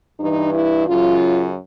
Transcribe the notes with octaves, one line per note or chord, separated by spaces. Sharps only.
G2 E3 D#4
E4
F#2 C#3 F#3 F4